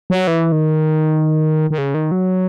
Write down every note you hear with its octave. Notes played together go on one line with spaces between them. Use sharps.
F#3
E3
D#3
D#3
C#3
D#3
F#3